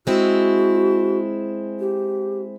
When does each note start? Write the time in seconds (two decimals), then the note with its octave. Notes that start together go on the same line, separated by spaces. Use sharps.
0.07 G#3 C4 E4 F#4
1.80 G4